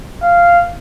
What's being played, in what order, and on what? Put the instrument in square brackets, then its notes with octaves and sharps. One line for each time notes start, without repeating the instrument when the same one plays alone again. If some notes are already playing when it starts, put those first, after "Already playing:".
[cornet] F5